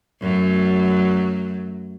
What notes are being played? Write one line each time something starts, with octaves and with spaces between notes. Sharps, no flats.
F#2 F#3 A3